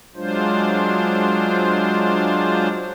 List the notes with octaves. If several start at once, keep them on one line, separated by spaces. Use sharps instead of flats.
F#3 G#3 D4 F4 C5